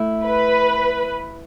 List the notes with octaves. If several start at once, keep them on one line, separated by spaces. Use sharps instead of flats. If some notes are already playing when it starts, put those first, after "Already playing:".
Already playing: A3 E4
B4